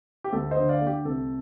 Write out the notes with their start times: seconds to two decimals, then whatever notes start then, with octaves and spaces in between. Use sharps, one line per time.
0.24 G4
0.32 D2 A4
0.51 C5 D#5
0.57 D3
0.69 D5 F5
0.81 A3
0.87 G4
1.05 C2 A4